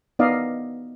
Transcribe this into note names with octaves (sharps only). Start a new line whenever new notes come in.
B3 D#4 D5 D#5 F5